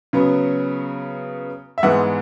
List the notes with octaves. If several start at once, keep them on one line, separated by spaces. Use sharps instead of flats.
C#3 F#3 B3
E5
G#2 E3 G#3 B3 F#5